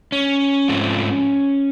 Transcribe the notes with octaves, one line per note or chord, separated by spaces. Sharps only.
C#4
G#2 F3 A3 C4